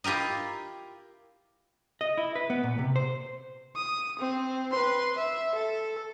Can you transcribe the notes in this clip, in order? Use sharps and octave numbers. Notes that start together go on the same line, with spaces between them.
E4 F4 G4 A#4 D#5
D#5
E4
B4
B3
A#2
C3
C5
D#6
C4
B4 C6
E5
A4